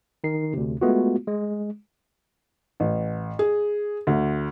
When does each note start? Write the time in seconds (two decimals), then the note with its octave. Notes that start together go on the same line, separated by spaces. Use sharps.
0.24 D#3 D#4 C7
0.53 D2 C3
0.81 G#3 A3 B3 F4 F#4
1.27 G#3
2.80 A1
3.39 G#4
4.07 D2